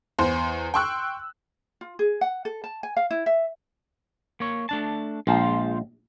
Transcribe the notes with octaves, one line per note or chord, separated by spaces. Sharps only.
E2 C5 C6
G5 C6 C#6 E6 F#6
F4
G#4
F#5
A4
A5
G#5
F5
E4
E5
A#3 C#5
A3 D4 A5
A#1 G#3 F4 C5